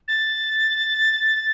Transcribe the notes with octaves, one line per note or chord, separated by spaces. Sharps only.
A6